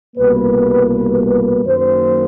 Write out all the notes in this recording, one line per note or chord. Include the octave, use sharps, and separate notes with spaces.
C2 B2 G3 A#3 B4
F#2 D#3 F#3 A#3 C5